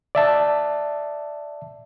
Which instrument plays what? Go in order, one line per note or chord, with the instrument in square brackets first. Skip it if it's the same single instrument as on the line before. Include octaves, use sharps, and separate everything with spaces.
[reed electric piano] D5 E5 A5